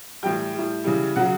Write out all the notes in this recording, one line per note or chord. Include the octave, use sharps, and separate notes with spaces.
A2 E3 G3 G5
A2 G3
C#3 E3 G3
C#3 F#3 F#5